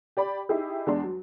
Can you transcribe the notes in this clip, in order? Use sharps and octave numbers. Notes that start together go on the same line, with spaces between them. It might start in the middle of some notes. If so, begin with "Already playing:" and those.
G4 D5 B5
D#4 E4 G4 G#4
E2 G#3 D4 C6
F#3